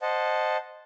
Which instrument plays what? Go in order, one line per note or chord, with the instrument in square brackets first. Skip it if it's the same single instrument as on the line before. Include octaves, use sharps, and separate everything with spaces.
[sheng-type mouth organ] C5 D#5 F#5 A5